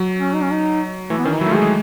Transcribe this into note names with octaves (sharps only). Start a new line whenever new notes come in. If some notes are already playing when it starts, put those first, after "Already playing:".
Already playing: F#3
C#4
D#4
C#4
D#4
E3 A3
B3
D#3 C#4
D#4
F#3 E4
A3
G#3
G#4
G#3